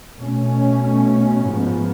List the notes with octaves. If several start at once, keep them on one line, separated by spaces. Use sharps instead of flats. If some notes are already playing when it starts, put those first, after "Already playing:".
B2 A3 C#4
G#2 F3 B3